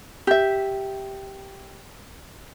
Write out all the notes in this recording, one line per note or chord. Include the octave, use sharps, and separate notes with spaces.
G4 E5